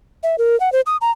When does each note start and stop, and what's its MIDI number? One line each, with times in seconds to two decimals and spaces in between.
0.23 0.36 76
0.38 0.58 70
0.60 0.72 78
0.72 0.81 72
0.86 0.97 87
1.01 1.11 82